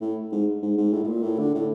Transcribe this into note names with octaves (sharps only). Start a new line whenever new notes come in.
A2
G#2
G#2
G#2
A2
A2
A#2
A2
D3
A2